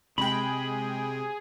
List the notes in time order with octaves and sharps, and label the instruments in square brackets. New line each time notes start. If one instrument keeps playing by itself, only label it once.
[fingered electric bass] C3 [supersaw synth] G#3 G5 [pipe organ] G#4 [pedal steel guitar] B5